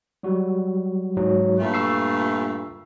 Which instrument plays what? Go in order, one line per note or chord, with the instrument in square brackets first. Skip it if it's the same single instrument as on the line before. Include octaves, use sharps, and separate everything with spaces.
[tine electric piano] F#3 G3 F#4
G#2 F#3
[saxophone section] G2 A#2 A3
[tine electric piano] C#6 E6 C7